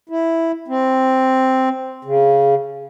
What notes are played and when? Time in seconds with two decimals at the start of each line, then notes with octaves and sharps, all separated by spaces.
0.09 E4
0.68 C4
2.05 C#3